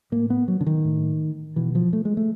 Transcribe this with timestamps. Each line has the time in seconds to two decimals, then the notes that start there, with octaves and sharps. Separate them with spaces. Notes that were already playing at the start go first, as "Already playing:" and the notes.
0.12 A2 A#3
0.30 B3
0.48 F#3
0.61 D3
0.66 D#3
0.85 A2
1.56 B2 E3
1.75 F3
1.93 A3
2.05 G#3
2.17 A3